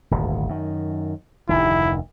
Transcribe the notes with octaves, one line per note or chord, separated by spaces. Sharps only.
D#1 G#1 D2
F#2 D#3
F1 D2 D#3 E4